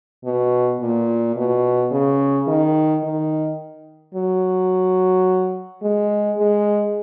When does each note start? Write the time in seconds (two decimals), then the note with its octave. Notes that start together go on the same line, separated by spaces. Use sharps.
0.24 B2
0.81 A#2
1.36 B2
1.91 C#3
2.47 D#3
3.03 D#3
4.14 F#3
5.82 G#3
6.38 G#3